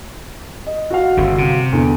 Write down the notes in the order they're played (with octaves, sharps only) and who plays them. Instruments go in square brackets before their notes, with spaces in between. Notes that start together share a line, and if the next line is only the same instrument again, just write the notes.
[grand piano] D#5
F#4 F5
[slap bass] G1 C#3
C3
[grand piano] E2 D3